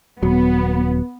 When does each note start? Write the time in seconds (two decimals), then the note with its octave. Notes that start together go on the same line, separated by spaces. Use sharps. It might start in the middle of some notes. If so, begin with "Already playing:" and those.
0.23 D#1 F#3 B3